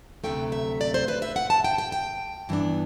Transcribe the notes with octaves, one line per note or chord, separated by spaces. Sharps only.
D2 C3 F#3 A3 G5
E5
D5
C5
B4
E5
F#5
A5
G5
G5
G5
G2 E3 B3 D4